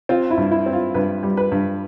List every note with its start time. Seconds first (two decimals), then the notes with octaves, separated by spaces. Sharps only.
0.09 C4 F4
0.31 E4
0.38 G2
0.51 E4
0.66 C4
0.73 F4
0.94 G2 B4
1.23 G3
1.37 B4
1.52 G2